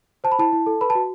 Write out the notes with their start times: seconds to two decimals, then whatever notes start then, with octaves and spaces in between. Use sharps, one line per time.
0.24 C5 A5
0.32 B5
0.39 E4 A5
0.53 E4
0.66 A4
0.81 B4 B5
0.90 A5
0.95 F#4